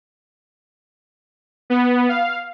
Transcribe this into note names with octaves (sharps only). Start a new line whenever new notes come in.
B3
F5